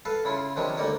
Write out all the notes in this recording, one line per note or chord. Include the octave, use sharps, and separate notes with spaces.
A4 B4 F5 A5
C#3 E4 F4
C3 D#3 F3 F#3 G#3 D4
D2 G3 A#3 D#4 C#5 D5